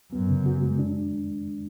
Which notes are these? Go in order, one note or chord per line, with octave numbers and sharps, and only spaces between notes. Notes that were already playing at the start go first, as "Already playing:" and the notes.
F#2 B3
C#3
F#4
G#3
D4